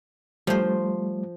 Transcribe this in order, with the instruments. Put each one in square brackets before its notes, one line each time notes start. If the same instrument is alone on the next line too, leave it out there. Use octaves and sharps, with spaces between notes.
[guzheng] F3 C5 [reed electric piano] G3 A3